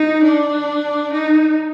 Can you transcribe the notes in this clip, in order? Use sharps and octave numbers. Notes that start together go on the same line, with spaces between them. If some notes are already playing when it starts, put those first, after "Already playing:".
Already playing: D#4
D4
D#4